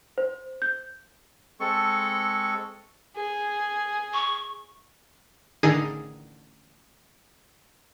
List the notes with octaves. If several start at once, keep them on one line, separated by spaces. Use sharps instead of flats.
C5
G6
G#3 C4 A4 C#6
G#4
C#6
A1 D3 D#3 D#4 G#4 D#6